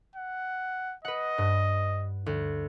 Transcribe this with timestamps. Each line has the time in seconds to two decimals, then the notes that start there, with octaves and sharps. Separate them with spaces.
0.16 F#5
1.05 B4 D#5 F#5
1.38 G2
2.26 D2